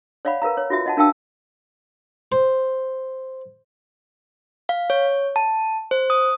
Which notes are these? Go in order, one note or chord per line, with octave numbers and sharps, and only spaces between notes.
C#5 D5 F5 F#5 B5
A#4 B4 F5 A#5
C#5
F4 F#4 E5
D#5 F#5 A5
D4 A#4 F5 G5 A5 E6
C5
F5
C#5
A5
C5
D#6